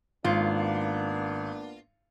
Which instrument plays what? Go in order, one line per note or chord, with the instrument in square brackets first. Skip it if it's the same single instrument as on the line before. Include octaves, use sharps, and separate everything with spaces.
[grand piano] G#1 [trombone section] A#3 B3 D4 [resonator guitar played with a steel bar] F4